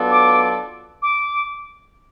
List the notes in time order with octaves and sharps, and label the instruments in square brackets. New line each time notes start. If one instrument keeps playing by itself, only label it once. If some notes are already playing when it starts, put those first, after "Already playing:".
Already playing: [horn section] F#3 B3 D4 F4 A4
[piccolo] D6
D6